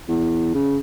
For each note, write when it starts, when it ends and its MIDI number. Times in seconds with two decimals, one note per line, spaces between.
0.08 0.53 40
0.54 0.78 49